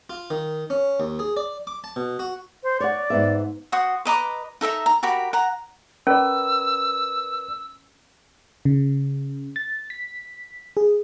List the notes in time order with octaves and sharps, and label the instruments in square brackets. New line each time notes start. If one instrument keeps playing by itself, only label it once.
[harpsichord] F4
D#3
C#4
D#2
G#4
D5
D6
A5
B2
F#4
[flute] C5
[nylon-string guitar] C#5 F#5 [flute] D5
[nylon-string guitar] G#2 B3 E5
[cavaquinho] F#4 C5 F#5 D#6
B4 D#5 A#5 D6
D#4 A4 E5 A#5
A#5
F#4 G4 A#4 B5
F#5 A#5
[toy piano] C#4 [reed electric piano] A#4 B4 D5 [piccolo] E6
[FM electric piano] C#3
A6
B6
G#4